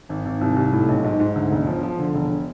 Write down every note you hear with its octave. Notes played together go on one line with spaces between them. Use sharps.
G#1
G#1
C2
C2
A2
B1
G#2
G#2
D2
E1
F3
F3
D3
E1